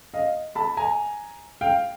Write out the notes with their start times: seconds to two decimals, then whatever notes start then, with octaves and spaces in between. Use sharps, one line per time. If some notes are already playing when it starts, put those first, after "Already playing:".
0.14 D#5 F5
0.55 A5 B5
0.77 G#5 A#5
1.61 F5 G5